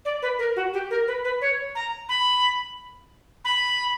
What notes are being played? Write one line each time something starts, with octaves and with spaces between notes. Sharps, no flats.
D5
B4
A#4
F#4
G4
A#4
B4
B4
C#5
A#5
B5
B5